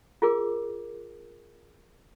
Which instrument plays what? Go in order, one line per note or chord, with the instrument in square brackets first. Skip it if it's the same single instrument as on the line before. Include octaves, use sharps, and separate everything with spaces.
[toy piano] F4 G#4 A#4 D6